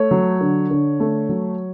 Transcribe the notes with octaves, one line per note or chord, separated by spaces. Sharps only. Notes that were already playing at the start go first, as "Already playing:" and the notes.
Already playing: A3 C#5
F#3
D3
D3
A3
F#3